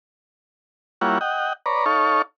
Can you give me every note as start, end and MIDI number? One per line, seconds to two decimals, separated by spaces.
1.01 1.18 55
1.01 1.18 58
1.01 1.18 64
1.01 1.18 65
1.01 1.18 73
1.01 1.18 78
1.21 1.53 75
1.21 1.53 78
1.21 1.53 79
1.66 1.85 71
1.66 1.85 73
1.66 1.85 74
1.66 1.85 82
1.86 2.22 63
1.86 2.22 69
1.86 2.22 73
1.86 2.22 77
1.86 2.22 85